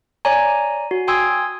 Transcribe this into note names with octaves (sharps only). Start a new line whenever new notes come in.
C#5 D5 G#5 A#5
F#4
G5 G#5 C6 D#6 E6 G#6